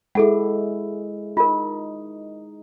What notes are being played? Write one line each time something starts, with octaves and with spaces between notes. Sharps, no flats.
G#3 E4 G#4 A4 F#5
D#4 F4 A#4